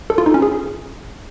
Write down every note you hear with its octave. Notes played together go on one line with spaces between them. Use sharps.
A4
F4
D#4
C#4
G#4